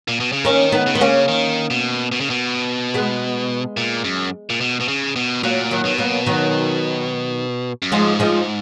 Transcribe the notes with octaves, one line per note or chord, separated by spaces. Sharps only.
A#2
B2
C#3
D#3 A#3 C#4
B3 D#4
C#3
D#3 B3
C#3 A#3 C#4
D#3
B2
B2
C#3
B2
G#3 B3
A#2
F#2
A#2
B2
B2
C#3
B2
A#2 F#3 A#3
D#3 F#3
B2
F#3 A#3
D#3 F#3
F#2
G#2 F3 G#3
F3 G#3